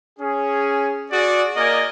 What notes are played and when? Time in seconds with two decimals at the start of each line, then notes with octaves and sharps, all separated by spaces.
0.19 C#4 G#4
1.11 F#4 G#4 D5
1.56 A#3 A#4 D5 D#5 G#5